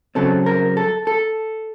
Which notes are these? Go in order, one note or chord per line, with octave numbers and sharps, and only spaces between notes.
C#3 F#3 C4 A4
A#4
A4
A4